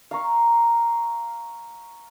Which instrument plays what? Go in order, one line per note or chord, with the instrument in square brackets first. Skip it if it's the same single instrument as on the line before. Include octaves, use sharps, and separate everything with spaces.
[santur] F5 A#5 C#6